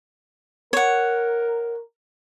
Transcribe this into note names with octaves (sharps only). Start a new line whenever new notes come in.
A#4 C#5 F#5